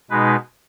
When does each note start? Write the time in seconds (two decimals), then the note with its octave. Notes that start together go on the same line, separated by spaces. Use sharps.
0.10 B2 G#3 D#4 B4